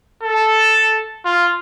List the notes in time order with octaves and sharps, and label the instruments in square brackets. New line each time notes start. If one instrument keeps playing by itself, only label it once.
[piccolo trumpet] A4
F4